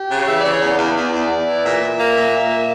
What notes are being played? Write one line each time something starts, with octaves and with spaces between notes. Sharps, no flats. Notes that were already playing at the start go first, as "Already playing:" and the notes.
Already playing: G4
C#3
E3 E5
C#3 D5
C#5
E2
D5
E2
E2
E2
E2
E3
A#2 E5
A#2
A#3
A#2
A#2
A#3